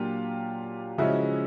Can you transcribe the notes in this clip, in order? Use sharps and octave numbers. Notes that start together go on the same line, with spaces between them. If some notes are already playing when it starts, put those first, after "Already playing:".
Already playing: A#2 F#3 A#3 D4 F4 G4
C#3 F3 G#3 C#4 E4 F#4